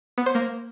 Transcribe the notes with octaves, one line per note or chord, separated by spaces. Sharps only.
B3
C5
A#3